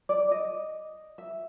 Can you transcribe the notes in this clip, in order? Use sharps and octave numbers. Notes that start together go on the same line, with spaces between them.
D5
D#5
E5